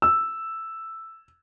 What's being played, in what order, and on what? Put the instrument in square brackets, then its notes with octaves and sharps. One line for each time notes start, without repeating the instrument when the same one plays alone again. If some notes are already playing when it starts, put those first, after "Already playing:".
[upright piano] E6